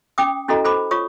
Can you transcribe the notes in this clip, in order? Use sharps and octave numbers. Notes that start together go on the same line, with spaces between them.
C#4 G5 D6 D#6
C#4 E4 F#4 A4 D#5 A#5
A4 C5 B5 D6
F4 C#5 C#6 D#6